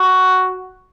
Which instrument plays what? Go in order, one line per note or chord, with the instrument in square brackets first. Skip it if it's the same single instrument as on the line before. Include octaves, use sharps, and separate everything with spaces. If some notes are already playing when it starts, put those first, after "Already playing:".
Already playing: [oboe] F#4